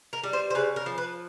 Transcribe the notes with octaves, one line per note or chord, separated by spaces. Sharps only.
A#4
G3
C5
C5
C#3 B4
A#4
F3
B4